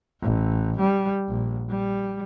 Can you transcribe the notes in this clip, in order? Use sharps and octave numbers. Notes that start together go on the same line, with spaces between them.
A1
G3
A#1
G3